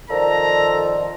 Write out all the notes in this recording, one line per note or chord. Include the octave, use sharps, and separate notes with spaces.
D#3 F3 A4 D5 A#5